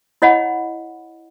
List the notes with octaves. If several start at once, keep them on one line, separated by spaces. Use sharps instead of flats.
E4 C#5 D#5 F#5 B5